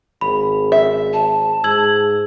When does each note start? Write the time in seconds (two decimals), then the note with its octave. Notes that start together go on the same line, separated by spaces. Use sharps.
0.21 G#1 B5
0.72 E5
1.13 A5
1.64 G#2 E6 G#6 F#7